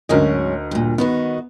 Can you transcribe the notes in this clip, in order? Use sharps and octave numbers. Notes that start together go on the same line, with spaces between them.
D2 G#2 F#3 C#4 A#4 D#5
G2 A#2
D#3 B3 D#4 F#4